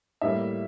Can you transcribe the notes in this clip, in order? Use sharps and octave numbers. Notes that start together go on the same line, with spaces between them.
A2 G3 A#3 E5